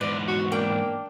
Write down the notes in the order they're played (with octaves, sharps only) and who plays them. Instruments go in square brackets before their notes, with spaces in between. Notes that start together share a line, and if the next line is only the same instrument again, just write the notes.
[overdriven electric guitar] E2 G#2 [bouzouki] B4 [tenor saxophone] D5
[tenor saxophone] F#4
[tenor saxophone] A#3 [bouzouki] D4 G5